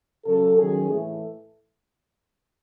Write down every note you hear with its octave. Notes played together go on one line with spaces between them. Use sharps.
C#3 F#3 C#4 A4
D#3 F#3 C#4 G#4
A2 E3 A3